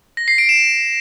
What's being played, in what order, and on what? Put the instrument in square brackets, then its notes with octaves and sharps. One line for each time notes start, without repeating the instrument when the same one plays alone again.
[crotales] A#6
C7
D7
E7